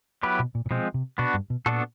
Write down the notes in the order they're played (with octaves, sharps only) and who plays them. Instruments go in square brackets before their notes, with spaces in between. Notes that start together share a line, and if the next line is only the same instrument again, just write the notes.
[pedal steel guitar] F#3 B3 E4 G4 B4
[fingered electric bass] B2
A#2
A#2
[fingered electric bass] B2 [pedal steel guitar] F3 G#3 C4
[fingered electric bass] C3
[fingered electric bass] B2 [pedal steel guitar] B3 D4 F#4
[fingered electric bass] G2
B2
[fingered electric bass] A#2 [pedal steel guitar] B3 D4 F#4 A4